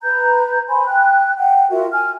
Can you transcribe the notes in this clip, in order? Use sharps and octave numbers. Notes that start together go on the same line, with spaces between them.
B4 A#5 G6
C5 G#5 B5 C6
G5 F#6
F#5 G5
F4 F#4 A#4 E5
G#5 F6